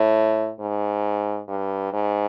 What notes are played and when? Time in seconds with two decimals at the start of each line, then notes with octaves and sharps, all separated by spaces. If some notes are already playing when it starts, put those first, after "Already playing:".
Already playing: A2
0.60 G#2
1.48 G2
1.93 G#2